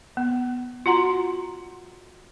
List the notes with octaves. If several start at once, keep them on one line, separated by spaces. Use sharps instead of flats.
B3
F4 F#4 F#5 A#5 C6